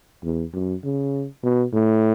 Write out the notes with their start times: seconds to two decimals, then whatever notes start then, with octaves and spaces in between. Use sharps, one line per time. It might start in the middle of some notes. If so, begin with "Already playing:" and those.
0.23 E2
0.54 F#2
0.84 C#3
1.44 B2
1.73 A2